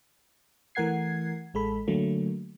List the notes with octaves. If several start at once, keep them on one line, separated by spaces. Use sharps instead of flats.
E3 A3 A#4 F#5 G#6 C7
A1 G#3 A4 B5
D3 F#3 A3 A#3